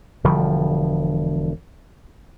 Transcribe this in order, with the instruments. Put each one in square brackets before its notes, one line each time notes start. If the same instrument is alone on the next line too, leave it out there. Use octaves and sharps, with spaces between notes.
[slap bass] E1 D3 F3 G3